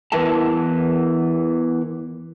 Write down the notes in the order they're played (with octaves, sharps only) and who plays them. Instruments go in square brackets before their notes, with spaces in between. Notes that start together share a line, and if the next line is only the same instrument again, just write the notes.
[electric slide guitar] E2 E3 E4 A#4 B4 A5